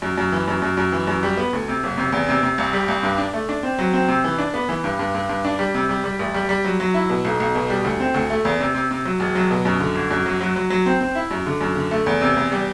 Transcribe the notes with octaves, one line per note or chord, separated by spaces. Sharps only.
F#2
F#2
E3
F#2
F#2
F#2
E3
F#2
G3
B3
D2
C3
F#1
C3
E2
C3
C3
C2
G3
C2
G2
D4
A3
D4
C4
F#3
C4
C3
E3
D4
B3
E3
G2
G2
G2
G2
D4
G3
C3
G3
G3
A1
G3
G3
F#3
F#3
E4
B2
B1
B1
B2
G3
D2
C4
D2
A3
E2
C3
C3
C3
F#3
E1
F#3
B2
F#2
D3
G1
F#2
F#3
F#3
F#3
F#3
C4
C4
E4
F#2
D3
F#2
D3
A3
E2
C3
E2
G3